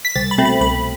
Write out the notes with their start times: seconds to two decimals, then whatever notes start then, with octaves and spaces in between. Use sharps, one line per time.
0.05 B6
0.16 C2 A6
0.31 B5
0.38 B2 A3 C4
0.45 B5
0.61 C2 B5